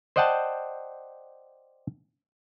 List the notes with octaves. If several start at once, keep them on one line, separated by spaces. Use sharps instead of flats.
C5 D5 D#5 F#5 G5 A5